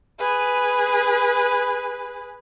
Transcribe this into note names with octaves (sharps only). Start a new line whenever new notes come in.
G#4 B4